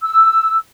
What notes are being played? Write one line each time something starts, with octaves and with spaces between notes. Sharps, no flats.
E6